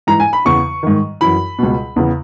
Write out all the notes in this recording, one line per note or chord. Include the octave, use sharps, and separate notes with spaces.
G#2 E3 A#5
G#5
B5
E2 C#3 E3 C#6
G#2 D#3
F#2 E3 B5
C#2 B2
E2 C#3 E3